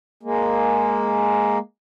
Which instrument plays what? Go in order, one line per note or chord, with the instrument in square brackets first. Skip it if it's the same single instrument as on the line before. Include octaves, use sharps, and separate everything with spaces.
[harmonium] G#3 A#3